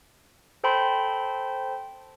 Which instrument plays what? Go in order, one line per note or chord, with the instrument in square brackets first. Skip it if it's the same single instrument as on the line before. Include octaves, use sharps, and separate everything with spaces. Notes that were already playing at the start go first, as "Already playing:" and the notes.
[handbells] A4 C5 G5 A5 B5 C6